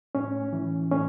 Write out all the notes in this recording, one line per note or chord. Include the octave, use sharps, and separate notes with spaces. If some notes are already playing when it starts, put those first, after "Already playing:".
A2 C#4
E3
A2 C#4